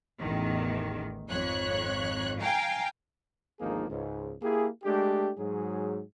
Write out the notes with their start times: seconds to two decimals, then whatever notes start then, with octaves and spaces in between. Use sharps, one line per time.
0.20 A1 E2 D#3
1.29 G#1 F2 C#5 F#6
2.41 F5 G5 G#5 A#5
3.59 G#1 D2 F3 A#3 D#4 G#4
3.89 C#2 G#2
4.42 A#3 E4 G4 G#4
4.84 G#3 A3 D4 G4
5.38 G#2 F#3 G#4